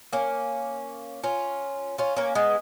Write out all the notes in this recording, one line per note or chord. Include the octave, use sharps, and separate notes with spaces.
A#3 C#4
C#4 F4
C#4 F4
A#3 C#4
G#3 B3